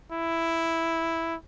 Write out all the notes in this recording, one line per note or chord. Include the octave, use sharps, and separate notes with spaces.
E4